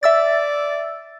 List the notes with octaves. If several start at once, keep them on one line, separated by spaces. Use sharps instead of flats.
D5 E5 E6 A6